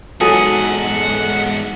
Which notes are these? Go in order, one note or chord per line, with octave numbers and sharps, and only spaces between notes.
E2 G#2 F#3 G#4 A4 F#5